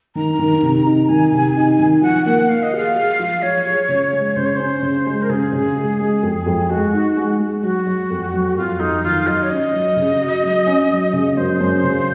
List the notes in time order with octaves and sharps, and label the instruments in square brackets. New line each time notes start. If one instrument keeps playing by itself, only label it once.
[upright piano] D#3 [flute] A#5
[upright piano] D#3
C3
D#4
[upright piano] D#3 [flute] G#5
[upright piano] C3
D#4
D#3
[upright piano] F3 [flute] F#5
[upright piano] A#3 [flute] F#5
[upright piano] A#3 [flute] F5
[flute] D#5
[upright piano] G#4 [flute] F5
[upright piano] G#4
F3
[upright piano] F3 [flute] C#5
[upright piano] G#4
C#3
G#3
[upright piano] C#3 [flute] C5
[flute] C#5
[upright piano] C#4 [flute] C5
[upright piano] C#3
G#3
[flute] A#4
[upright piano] C#3 [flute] G#4
[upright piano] C#3
G#3
G#3
F2
F2
[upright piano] G#3 [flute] F#4
[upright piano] D#4
G#3
G#3
[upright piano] F#3 [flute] F#4
[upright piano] F#3
F2
F#3
[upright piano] F2 [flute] F4
[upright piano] F2 [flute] D#4
[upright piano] D#3 [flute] F4
[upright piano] F#3 [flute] D#5
[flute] C#5
[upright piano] C#4 [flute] D#5
[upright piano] F#3
C#3
F#4
F#3
C#4
F#3
C#3
[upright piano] F#2 [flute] C5
[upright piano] F#2
C#3